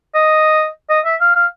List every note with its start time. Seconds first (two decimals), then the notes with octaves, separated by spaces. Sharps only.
0.15 D#5
0.90 D#5
1.05 E5
1.21 F5
1.35 F5